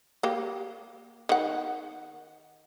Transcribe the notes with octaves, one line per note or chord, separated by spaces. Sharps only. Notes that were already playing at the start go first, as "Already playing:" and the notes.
A#3 G4
D#3 F#5